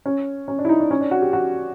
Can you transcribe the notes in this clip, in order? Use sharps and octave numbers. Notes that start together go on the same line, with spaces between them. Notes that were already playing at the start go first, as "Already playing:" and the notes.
C#4
C#4
D4
E4
D#4
D4
C#4
D4
F#4
G4
F#4